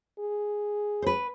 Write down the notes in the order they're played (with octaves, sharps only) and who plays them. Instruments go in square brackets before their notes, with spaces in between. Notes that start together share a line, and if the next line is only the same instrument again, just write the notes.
[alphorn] G#4
[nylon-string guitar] B4 C5